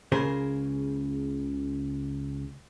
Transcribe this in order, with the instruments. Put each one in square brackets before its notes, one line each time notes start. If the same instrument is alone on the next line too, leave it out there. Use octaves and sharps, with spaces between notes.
[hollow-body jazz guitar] C#2 C#3 G#4 A#4 C5